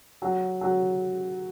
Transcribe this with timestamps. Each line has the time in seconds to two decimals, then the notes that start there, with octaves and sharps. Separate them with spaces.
0.22 F#3
0.61 F#3